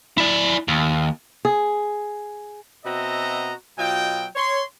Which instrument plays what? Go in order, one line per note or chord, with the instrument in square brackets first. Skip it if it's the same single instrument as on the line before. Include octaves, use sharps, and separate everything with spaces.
[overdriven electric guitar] E4 D5
D#2
[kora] G#4
[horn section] B2 C4 F#4 D#5 E5 A#5
B2 F#3 F4 D#5 G5
C#5 C6